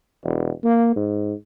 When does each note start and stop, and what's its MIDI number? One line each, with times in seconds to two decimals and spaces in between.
0.24 0.50 28
0.64 0.94 58
0.96 1.33 44